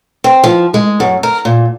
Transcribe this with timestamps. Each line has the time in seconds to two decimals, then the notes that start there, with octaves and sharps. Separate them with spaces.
0.24 C4
0.44 F3
0.74 G#3
1.00 F#2
1.23 A#4
1.45 A#2